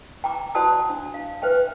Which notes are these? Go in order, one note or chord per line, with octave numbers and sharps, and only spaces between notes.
G5 A#5 D6
F#4 C5 D5 F#5 A5 D#6
D4
F5
B4 C5 E5 G5